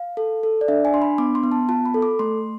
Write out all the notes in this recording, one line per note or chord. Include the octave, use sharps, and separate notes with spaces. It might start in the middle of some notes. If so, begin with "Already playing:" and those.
Already playing: F5
A4
A4
D5
D4 E5
G#5
D4 C6
B5
B3 D6
C6
B3
A5
F4 A5
B5
A4
D6
A3 C6